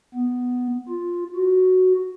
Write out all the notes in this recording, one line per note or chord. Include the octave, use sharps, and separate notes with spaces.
B3
F4
F#4